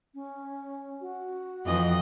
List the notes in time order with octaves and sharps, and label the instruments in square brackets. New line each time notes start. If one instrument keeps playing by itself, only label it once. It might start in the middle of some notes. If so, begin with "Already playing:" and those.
[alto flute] C#4
F#4
[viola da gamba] F2 E3 D#5